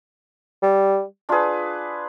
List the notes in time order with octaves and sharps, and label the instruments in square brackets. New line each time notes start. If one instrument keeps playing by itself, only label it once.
[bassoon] G3
[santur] D4 F4 G#4 B4